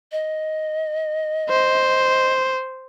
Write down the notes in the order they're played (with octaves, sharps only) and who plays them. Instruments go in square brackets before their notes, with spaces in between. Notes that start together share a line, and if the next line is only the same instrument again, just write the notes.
[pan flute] D#5
[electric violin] C5